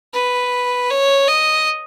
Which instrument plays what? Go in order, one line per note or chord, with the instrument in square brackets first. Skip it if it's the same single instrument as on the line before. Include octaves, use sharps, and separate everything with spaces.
[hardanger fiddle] B4
C#5
D#5